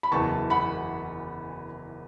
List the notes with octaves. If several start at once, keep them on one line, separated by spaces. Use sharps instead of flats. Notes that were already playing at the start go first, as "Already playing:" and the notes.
B5
F#1 E2 E3 A5 C#6
F#5 B5